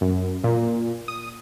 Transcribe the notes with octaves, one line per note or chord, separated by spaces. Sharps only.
F#2
A#2
D#6